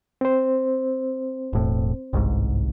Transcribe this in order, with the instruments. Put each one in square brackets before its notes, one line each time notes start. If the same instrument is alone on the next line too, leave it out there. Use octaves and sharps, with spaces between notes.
[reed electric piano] C4 C5
[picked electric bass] E1 A2
G1 C2 G#2